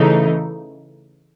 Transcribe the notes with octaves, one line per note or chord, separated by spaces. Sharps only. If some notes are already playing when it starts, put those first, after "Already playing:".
Already playing: C#3 E3 A3 D#4